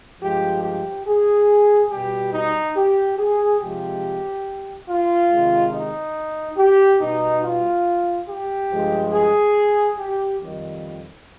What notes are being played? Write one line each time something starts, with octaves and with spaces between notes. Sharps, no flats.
G2 F3 G#3 G4
G4
G#4
B2 G3 G4
D#4
G4
G#4
C3 F3 G#3 G4
F4
C3 D#3 G#3
D#4
G4
B2 G3 D#4
F4
G4
G2 F3 G#3
G#4
G4
F2 D#3 G3